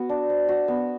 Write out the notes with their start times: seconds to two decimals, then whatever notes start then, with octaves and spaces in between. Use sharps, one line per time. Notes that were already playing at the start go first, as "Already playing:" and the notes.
Already playing: B3 F#4
0.09 D4
0.30 C5
0.49 F#4
0.68 B3